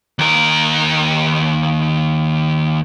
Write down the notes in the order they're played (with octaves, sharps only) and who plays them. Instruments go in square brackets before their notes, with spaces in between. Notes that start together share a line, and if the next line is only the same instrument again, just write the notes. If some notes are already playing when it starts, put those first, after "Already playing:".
[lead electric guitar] D#2 A#4